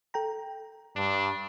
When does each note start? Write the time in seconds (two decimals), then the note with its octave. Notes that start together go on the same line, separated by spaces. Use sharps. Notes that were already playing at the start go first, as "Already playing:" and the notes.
0.14 A4 G5 A#5
0.96 G2 D4